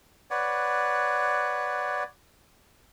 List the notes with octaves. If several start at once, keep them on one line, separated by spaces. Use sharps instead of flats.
B4 C#5 D5 F#5